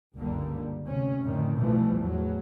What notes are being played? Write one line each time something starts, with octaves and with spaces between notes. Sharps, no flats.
F#1 C#2 G2 D3 G3 A#3
D2 C3 C#4
F2 A2 D3 D#3
B1 B2 E3 F3 G3 A3
E2 A2 F#3